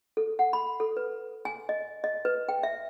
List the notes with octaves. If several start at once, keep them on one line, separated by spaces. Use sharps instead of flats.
A4
F#5
B5
A4
B4
G#5
D#5
D#5
B4
G5
E5